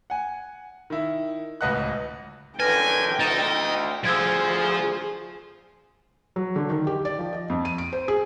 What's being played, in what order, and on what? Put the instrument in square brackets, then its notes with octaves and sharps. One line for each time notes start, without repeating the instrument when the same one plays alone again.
[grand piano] F#5 G#5
D#3 E4
D1 C#2 B4 D#5 F#5 F#6
[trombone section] F#2 D3 [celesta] B4 A#6 [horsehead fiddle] G5 [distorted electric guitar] G#5
[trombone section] D2 [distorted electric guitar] D#4 [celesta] A6 E7
[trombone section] D2 C5 [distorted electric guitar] F3 [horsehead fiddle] G#4 [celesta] E6 G#6
[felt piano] F#3
D3
D#3
G4
D5
F3
D#5
F2
D#7
D7
C5
G#4